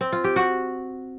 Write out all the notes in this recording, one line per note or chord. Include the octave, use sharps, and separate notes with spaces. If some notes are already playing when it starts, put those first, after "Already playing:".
C4
F4
G4
F#4